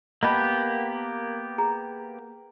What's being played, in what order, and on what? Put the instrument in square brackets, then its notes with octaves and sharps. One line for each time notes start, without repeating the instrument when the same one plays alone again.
[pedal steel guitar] A#3 B3 G4 [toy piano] D#5 A5 B5
[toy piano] G#4 A#5